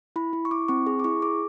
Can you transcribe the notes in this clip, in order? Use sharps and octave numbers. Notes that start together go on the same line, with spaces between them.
E4 B5
E4
C#6
E4 D6
C4 C#6
G#4
D6
E4 C#6
G#4 D6